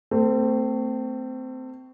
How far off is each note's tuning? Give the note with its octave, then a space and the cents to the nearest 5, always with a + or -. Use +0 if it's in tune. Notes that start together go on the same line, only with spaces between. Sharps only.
A3 +25 C4 -20